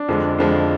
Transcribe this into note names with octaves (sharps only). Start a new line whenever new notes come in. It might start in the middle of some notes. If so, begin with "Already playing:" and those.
Already playing: D4
F2 D3 F3 G#3
F2 D3 F3 G#3